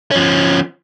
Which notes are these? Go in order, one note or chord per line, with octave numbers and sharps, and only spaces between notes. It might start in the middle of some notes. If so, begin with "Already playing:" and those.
F3 C#4